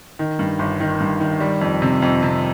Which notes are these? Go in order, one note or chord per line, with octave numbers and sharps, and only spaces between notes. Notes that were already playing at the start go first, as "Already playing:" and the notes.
D#3
G2
G1
D#3
G2
D#3
G3
F2
C3
F2
C3